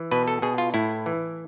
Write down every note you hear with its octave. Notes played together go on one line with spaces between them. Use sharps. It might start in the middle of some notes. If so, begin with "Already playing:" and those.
Already playing: E3
B2 B4
A4
B2 G#4
F4
A2 E4
E3